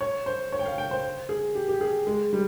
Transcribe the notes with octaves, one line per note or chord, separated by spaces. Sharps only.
C#5
C5
C#5
G5
F5
G5
C5
G#4
G4
G4
G#4
G#3
G3